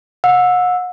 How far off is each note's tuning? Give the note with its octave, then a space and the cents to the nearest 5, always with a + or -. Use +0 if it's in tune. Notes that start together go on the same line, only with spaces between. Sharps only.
F#5 -40 E6 +0